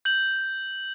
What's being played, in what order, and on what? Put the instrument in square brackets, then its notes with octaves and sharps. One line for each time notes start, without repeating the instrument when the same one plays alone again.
[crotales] G6 F#7